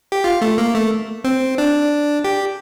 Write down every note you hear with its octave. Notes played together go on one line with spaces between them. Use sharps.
G4
F4
A3
A#3
A3
C4
D4
G4